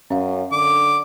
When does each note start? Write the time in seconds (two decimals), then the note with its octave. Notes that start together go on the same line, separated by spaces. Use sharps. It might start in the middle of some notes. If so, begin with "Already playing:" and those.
0.10 F#2 C#4 F5
0.52 D3 D6